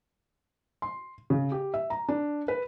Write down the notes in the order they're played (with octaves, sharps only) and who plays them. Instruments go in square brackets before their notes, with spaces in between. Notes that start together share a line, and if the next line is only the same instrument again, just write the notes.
[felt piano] C6
C#3
G4
E5
A#5
D4
B4